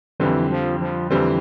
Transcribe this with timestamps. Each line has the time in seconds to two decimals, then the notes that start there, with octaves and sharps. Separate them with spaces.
0.20 F2 D3 E3 G3 C4
0.50 F3
0.80 F3
1.10 F2 D3 E3 G3 C4